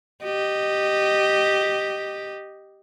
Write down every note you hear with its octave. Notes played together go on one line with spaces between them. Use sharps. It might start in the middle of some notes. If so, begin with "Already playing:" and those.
G4 D#5